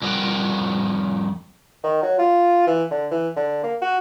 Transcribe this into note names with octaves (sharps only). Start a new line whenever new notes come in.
F2 G3 A#4 F#5 G5
D#3
F#3
F4
E3
D3
E3
D3
A#3
F#4